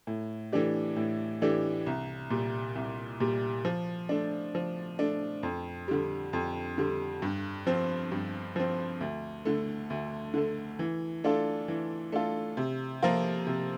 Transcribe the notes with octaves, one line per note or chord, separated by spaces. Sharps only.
A2
E3 A3 D4 G4
A2
E3 A3 D4 G4
C2
A#2 G3
C2
A#2 G3
F3
A3 D4
F3
A3 D4
F2
D3 G3
F2
D3 G3
G2
F3 C4
G2
F3 C4
D2
D3 A3
D2
D3 A3
E3
A3 D4 F4 A4
E3
A3 D4 F4 A4
C3
F3 A#3 F4 A#4
C3